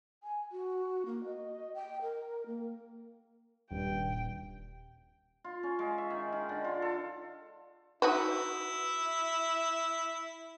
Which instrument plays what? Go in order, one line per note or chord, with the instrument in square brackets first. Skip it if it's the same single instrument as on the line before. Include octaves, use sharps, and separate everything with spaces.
[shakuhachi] G#5
F#4
A#3
D#5
G5
A#4
A#3
[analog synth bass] D#1 [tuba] G2 [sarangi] G5
[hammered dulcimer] F4
C#4
G#3
E5
D#3
D#3
D3
F4
A4
[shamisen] D#4 F#4 B4 [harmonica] E4